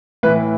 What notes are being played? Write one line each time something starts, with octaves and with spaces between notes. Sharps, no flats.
A2 E3 B4